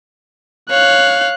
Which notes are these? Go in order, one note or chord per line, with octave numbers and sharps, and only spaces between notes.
C#5 F5 F#6